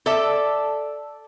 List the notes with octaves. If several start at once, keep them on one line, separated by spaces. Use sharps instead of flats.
A4 D5 E5